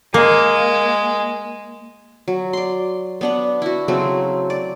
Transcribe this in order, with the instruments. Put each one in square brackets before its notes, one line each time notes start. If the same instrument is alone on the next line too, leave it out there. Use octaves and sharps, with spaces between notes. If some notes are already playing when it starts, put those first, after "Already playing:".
[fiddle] G#3 [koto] A#3
[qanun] F#3
D5 C6
B3 D4 F#5
E4 F#4
C#3 F#3 A3 C4
D5